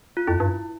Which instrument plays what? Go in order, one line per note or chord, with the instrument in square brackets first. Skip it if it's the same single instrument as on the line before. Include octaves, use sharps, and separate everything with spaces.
[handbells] F4
[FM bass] F2 [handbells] E4
[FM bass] G2